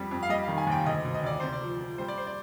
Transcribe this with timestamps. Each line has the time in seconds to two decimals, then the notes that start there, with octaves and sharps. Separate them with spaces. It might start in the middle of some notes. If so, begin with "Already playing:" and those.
Already playing: F2 G3
0.11 F2
0.23 F5
0.29 G3 D#5
0.43 F5
0.48 D#3
0.58 G#5
0.67 D#2 G5
0.85 D2 D#5
1.05 D2
1.14 D#5
1.23 D2 D5
1.40 C3 C5
1.53 D5
1.61 F3
1.80 F3
1.98 G3 C5
2.08 D5
2.18 C5
2.27 D5